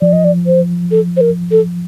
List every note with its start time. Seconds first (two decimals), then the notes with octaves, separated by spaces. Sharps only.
0.01 F3 D5
0.13 D#5
0.24 D5
0.46 C5
0.91 A4
1.17 C5
1.21 A#4
1.51 A4